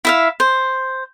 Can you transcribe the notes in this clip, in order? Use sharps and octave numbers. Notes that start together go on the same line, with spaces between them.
E4 E5 F5
C5